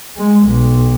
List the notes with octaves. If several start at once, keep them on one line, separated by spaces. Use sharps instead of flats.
G#3
B1